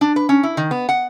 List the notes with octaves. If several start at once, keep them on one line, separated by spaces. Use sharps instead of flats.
D4
B4
C#4
E4
D#3
B3
F#5